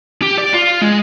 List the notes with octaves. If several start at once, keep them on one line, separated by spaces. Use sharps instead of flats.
G4
D5
F4
G#3